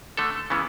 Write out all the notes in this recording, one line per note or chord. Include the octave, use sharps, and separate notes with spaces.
D3 A3 A4
C#3 E3 G#3 B3